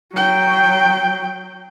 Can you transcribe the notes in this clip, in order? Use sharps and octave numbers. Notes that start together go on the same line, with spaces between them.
F#3 G5